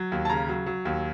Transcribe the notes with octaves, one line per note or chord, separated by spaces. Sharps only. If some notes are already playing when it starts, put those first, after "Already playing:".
Already playing: F#3
D#2
A5
C#3 A#5
F#3
F#3
D#2